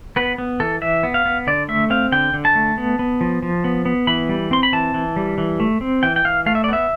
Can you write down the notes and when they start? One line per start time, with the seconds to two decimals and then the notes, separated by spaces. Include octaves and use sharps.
0.16 B3 B4
0.38 B3
0.60 E3 A4
0.82 E3 E5
1.03 B3
1.14 F5
1.26 B3
1.47 D3 D5
1.68 A3 E5
1.90 C4 F5
2.12 D3 G5
2.34 D3
2.45 A5
2.55 A3
2.78 B3
2.99 B3
3.21 F3
3.42 F3
3.64 B3
3.85 B3
4.07 E3 B5
4.29 G3
4.51 C4 C6
4.63 B5
4.73 E3 A5
4.94 E3
5.16 G3
5.38 E3
5.60 A3
5.81 C4
6.03 E3 G5
6.16 G5
6.25 E3 F5
6.46 A3 F5
6.55 E5
6.64 D5
6.69 B3 E5